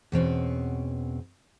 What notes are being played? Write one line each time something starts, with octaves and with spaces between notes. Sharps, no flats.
E2 B2 C4 C#4